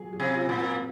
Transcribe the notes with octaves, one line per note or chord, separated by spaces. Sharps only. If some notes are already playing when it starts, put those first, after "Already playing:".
Already playing: F#3 G#4
G#4
C3
F4
A#2
C4